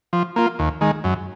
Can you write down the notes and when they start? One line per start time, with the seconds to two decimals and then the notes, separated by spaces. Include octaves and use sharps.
0.13 F3
0.36 A#3 F4
0.59 D#2
0.81 D#3 G#3
1.04 F#2